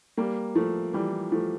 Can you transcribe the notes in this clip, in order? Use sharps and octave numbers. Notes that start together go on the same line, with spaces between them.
G3 A#3
F3 A3
E3 G3
F3 A3